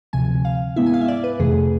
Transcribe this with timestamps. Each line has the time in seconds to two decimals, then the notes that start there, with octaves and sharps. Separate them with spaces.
0.13 D2 C3 F3 G#5
0.45 F5
0.76 G#2 G#3 B3 E4 E5
0.86 G#5
0.94 F5
1.01 E5
1.08 D5
1.24 B4
1.39 F2 C3 E3 A3 G#4